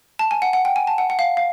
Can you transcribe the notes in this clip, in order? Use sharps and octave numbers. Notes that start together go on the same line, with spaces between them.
A5
G#5
F#5
F#5
G5
G#5
A5
F#5
F#5
F5
F5